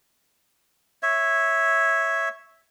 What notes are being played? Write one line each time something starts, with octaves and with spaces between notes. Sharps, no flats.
C#5 E5